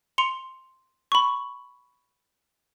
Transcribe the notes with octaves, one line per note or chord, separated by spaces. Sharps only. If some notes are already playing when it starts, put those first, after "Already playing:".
C6 C#7 F7
B5 C#6